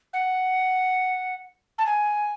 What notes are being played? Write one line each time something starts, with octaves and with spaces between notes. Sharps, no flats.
F#5
A5
G#5